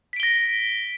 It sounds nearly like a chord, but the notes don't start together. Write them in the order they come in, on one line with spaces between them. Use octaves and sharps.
B6 D7 G7 A#6